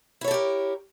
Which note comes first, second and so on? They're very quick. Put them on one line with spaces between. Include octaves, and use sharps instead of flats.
E4 C#5 A4 G4 A#4